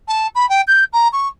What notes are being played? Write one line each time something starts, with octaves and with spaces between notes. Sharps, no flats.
A5
B5
G5
G6
A#5
C#6